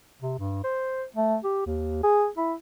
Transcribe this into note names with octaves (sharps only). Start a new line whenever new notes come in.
C3
G2
C5
A3
G4
D#2
G#4
E4